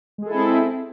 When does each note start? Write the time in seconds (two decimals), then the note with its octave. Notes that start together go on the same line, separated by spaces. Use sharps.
0.18 G#3
0.22 G#4
0.26 A4
0.30 E4
0.34 C4